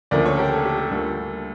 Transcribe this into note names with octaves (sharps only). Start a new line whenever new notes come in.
D2 C#3 F3 A#3 A#4 D5
A4 C#5
G4 A#4
A4
G4
A4
D2 D3 G3 A#3